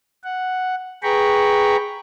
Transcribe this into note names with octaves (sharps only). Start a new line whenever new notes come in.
F#5
G#4 B4 G5 A#5 B5 C#6